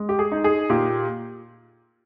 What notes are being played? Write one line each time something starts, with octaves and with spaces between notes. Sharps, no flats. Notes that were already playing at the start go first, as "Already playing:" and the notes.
Already playing: G#3
G4
G#4
D#4
G#4
A#2 G4